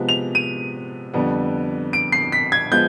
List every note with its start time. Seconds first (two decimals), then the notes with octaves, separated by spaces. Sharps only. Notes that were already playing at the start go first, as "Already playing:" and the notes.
Already playing: C3 F3 G#3 B3
0.09 F7
0.35 D#7
1.14 F2 D3 G3 B3
1.93 D7
2.12 C7
2.32 B6
2.52 G#6
2.72 F3 G#3 B3 G6